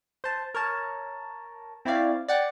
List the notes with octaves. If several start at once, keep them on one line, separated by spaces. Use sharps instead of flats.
C5 A5
A#4 C#5 A5
C4 E4 C#5 D5 F5
D5 F#5 G5